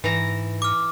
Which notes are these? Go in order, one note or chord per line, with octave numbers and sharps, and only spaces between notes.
G#2 E3 A#5
D6 F6